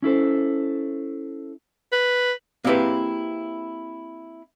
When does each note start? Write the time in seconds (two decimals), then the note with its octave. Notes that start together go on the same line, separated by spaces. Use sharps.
0.02 C#4 E4 A4 C5
1.92 B4
2.64 A#3 C4 E4 G4 G#4 B4